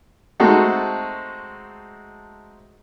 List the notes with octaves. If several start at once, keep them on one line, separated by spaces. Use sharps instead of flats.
G#3 A3 C4 D#4 F#4 A4